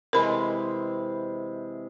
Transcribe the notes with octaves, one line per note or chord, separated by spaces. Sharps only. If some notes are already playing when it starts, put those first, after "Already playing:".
C3 E3 G#3 A#4 B5